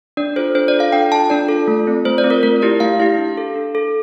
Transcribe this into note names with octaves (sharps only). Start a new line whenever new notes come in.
D4 D5
F4 A4 C5
D4 C5
D5
F4
A4 F5
D4 G5
F4 A4 A5
D4 D5
F4 A4
A3
C4 F4
A3 C5
D5
C4 F4
A#4
A3 A#4
E4 G4 D5
A3 F5
E4 G4 F5
D4
A4
D4
A4